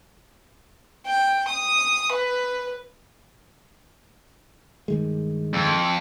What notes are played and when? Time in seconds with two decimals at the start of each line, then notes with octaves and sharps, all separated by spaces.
1.06 G5
1.48 D#6
2.12 B4
4.88 G2 D#3 G#3
5.53 F2